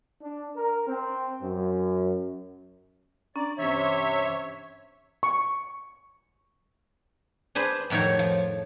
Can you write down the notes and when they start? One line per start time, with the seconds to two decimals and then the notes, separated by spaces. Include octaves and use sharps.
0.22 D4
0.56 A#4
0.88 C4
1.42 F#2
3.36 C#4 D4 D5 A#5
3.58 G2 C3 E3 C#5 E5
5.23 C#6
7.55 D4 G#4 B4 C5
7.90 F2 A2 D#3 F#4 C#5
8.19 F3